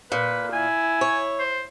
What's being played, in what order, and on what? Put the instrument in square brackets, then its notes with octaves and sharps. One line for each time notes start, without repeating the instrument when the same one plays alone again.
[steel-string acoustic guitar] A#2 [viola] B4
[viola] E4 [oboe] G#5
[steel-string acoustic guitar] C#5
[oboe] C5